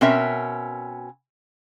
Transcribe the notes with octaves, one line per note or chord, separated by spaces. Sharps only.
B2 C4 C#4 A#4 E5